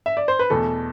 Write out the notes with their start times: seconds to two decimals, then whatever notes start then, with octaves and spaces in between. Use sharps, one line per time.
0.06 E5
0.17 D5
0.28 C5
0.39 B4
0.50 E2 B2 A3 A4